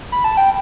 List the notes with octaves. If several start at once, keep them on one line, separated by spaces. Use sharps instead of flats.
B5
A5
G5